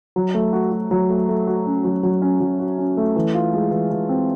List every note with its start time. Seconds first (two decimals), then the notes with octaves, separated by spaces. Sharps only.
0.16 F#3
0.34 A3
0.53 F#4
0.71 F#4
0.91 F#3
1.09 A3
1.29 A3
1.47 F#4
1.66 C#4
1.85 F#3
2.03 F#3
2.22 C#4
2.40 F#3
2.59 F#4
2.78 C#4
2.97 A3
3.16 E3
3.34 F4
3.53 G#3
3.71 E3
3.91 E3
4.09 C4